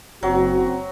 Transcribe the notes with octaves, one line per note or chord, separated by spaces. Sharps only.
F#1 F#2 F#3 C4 F#4